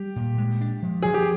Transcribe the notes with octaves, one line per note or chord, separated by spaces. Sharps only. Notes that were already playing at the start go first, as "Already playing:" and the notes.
Already playing: G3 G4
A#2
G#3
D4
F3
F3 G#4
G4